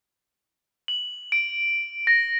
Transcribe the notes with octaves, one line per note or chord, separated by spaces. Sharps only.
F#7
D7
A#6